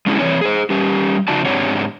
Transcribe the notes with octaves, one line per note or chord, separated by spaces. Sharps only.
G#3 C#4 D4 E4 G#4
E3 C4 C#5 D5
G#4 C5
G3 C#4 G4
C#3 F3 D#4 F#4 D5 A5
G#2 C4 D4 G4 C#5 F#5